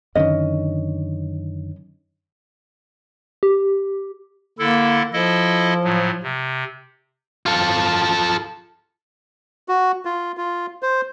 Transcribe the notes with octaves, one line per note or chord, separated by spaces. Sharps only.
F#2 D3 D#3 C#4 D#5
G4
D3 A#3 E4 A4
F3 E4 A4 D#5
A2 F#3
C3
F4 A4
F#4
F4
F4
C5